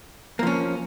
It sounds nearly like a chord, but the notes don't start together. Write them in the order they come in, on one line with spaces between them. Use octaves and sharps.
A#3 F3 C#4